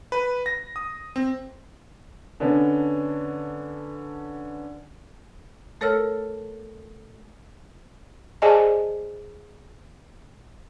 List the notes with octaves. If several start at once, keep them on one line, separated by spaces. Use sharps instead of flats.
B4
A#6
D#6
C4
D3 B3 C#4 D4
A3 A4 A#4 C#5 E6 F6
G#4 C5 D5 D#5 G#5 A5